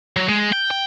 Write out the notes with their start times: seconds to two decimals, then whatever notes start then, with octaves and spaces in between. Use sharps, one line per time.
0.17 F#3
0.29 G#3
0.52 G5
0.71 G5